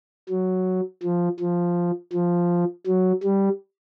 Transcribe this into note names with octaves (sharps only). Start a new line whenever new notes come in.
F#3
F3
F3
F3
F#3
G3